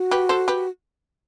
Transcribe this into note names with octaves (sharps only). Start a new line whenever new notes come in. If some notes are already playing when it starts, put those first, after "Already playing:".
Already playing: F#4
G4 B4
A4 C5
G4 B4